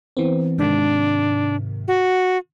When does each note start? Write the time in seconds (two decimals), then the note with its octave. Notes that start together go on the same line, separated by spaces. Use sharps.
0.17 E3 B3 C4
0.58 G#2 C3 D#3 D4
1.88 F#4